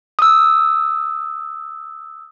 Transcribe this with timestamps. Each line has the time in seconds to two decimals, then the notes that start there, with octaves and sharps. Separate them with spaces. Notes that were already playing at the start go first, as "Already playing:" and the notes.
0.19 D#6 E6